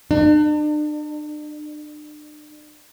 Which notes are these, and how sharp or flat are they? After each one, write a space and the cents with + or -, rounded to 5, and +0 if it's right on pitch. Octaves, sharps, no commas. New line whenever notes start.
D4 +40